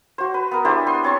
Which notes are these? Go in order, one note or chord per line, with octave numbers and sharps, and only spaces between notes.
F#4 C5
B4
B3 A#4
D4 E4 G4 C5
B3 C6
C4 C#5 A5 C6